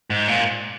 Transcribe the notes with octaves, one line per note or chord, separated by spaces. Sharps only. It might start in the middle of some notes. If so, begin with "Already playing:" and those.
G#2
A#2